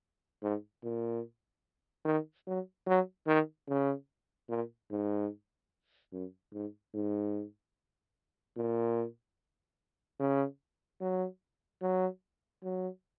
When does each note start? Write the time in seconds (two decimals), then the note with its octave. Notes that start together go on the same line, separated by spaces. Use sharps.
0.42 G#2
0.84 A#2
2.05 D#3
2.47 F#3
2.87 F#3
3.27 D#3
3.68 C#3
4.49 A#2
4.91 G#2
6.12 F#2
6.53 G#2
6.94 G#2
8.57 A#2
10.20 C#3
11.01 F#3
11.82 F#3
12.63 F#3